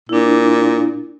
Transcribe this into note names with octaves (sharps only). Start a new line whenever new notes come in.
A#2 D4 E4